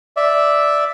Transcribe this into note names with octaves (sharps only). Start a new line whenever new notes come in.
D5 E5